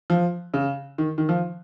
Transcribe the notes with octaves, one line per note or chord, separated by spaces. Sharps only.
F3
C#3
D#3
D#3
F3